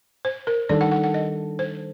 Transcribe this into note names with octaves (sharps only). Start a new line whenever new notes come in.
C5
A#4
D#3 G3 D4 A4 D5
F#5
F#5
F#5
D#5
C5